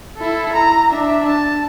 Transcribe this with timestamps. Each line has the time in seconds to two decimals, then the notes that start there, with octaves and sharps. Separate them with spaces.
0.17 E4 A4
0.54 A#5
0.92 D4 E5
1.26 A5